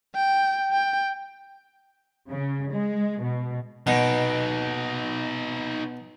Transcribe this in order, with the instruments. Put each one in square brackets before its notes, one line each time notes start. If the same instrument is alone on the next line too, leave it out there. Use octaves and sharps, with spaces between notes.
[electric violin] G5
G5
[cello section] C#3
G#3
B2
[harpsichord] B2 [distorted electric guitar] D#4 B4